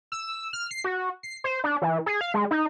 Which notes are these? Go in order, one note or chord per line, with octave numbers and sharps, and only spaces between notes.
E6
F6
C7
F#4
C7
C5
D4
E3
G#4
F5
G#3
D#4